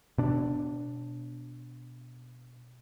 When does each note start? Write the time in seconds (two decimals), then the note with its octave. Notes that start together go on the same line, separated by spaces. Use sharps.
0.18 B2 D4